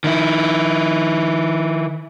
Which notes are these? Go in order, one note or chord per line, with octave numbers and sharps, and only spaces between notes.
D#3 E4